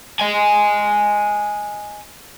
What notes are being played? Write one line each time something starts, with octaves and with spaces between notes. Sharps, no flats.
D#5 G#5